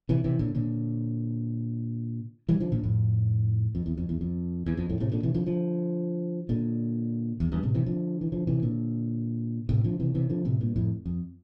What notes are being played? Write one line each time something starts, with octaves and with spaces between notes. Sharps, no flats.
C3 E3
C3 E3
A#2 D3
A#2 D3
E3 G3
D3 F3
A#2 D3
F2 A2
F2
E2
F2
E2
F2
E2
F2
F2 A2
A2 C3
A#2 D3
C3 E3
D3 F3
D3 F3
A#2 D3
E2
E2 G2
A2 C3
C3 E3
D3 F3
E3
D3 F3
C3 E3
A#2 D3
A2 C3
D3 F3
C3 E3
C3 E3
D3 F3
A2 C3
G2 A#2
F2 A2
F2